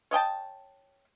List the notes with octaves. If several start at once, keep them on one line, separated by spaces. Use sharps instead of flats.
C#5 D#5 G5 A5